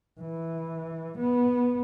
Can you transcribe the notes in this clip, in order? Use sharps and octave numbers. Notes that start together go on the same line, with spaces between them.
E3
B3